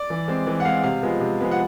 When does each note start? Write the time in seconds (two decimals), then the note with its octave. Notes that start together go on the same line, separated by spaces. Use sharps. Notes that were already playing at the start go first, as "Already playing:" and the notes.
Already playing: D5
0.10 E3
0.28 G#3 C4
0.47 E3
0.60 F#5
0.65 G#3 C4 F5
0.83 C3 F5
1.03 F3 G#3 B3
1.21 C3
1.40 F3 G#3 B3
1.51 F#5